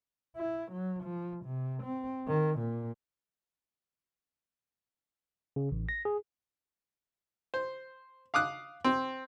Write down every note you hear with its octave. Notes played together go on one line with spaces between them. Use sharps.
E4
F#3
F3
C3
C4
D#3
A#2
C#3
A1
A#6
G#4
C5
F5 D6 D#6 F#6
C4